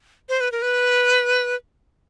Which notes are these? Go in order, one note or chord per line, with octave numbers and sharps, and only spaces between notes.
C5
B4
A#4
B4